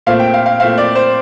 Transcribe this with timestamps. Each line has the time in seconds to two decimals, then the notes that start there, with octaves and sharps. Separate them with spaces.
0.07 A#2 A3 C4 F5
0.20 G5
0.34 F5
0.46 F5
0.60 A#2 A3 C4 F5
0.78 D5
0.95 C5